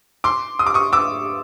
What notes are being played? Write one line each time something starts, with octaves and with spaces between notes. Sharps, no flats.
C6 D6
D#6
D6
C#6 D#6
D6 E6